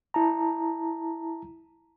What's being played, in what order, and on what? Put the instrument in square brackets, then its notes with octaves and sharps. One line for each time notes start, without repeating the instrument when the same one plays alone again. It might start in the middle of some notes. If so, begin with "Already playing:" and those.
[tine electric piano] E4 A5 A#5